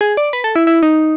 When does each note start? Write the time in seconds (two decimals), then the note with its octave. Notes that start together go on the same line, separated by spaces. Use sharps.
0.01 G#4
0.17 D5
0.33 B4
0.44 A4
0.56 E4
0.67 E4
0.83 D#4